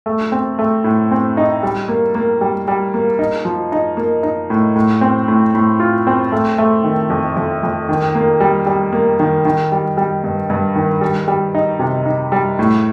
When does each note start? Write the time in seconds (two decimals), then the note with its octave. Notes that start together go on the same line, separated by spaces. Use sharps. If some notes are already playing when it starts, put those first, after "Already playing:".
0.06 A3
0.32 C4
0.59 A3
0.84 A2
1.11 C4
1.37 D#4
1.63 G3
1.88 A#3
2.15 A#3
2.41 G3
2.68 G3
2.94 A#3
3.19 D#4
3.45 F3
3.72 D#4
3.97 A#3
4.23 D#4
4.50 A2
4.75 A2
5.01 C4
5.28 A2
5.55 A2
5.80 F4
6.07 C4
6.32 A3
6.58 A3
6.84 D#3
7.10 F2
7.37 F2
7.63 F2
7.89 D#3
8.15 A#3
8.40 G3
8.66 G3
8.93 A#3
9.20 D#3
9.45 D#3
9.72 G3
9.97 G3
10.24 G2
10.50 G2
10.76 D#3
11.01 G3
11.28 G3
11.55 D#4
11.79 C3
12.06 D#4
12.32 G3
12.59 A2